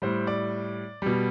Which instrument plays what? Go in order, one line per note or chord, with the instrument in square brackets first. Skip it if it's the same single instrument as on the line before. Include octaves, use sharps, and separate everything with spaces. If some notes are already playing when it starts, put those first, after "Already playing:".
[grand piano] A2 G3 C5
D5
B2 G3